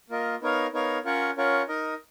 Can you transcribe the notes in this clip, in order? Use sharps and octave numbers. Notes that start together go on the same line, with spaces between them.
A#3 F4 A#4 D#5
B3 D#4 A#4 C#5 F5
B3 D#4 A#4 C#5 F5
C#4 F4 A#4 C#5 F#5
C#4 F4 A#4 C#5 F#5
D#4 A#4 D#5